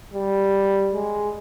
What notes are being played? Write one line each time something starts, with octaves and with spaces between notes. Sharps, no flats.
G3
G#3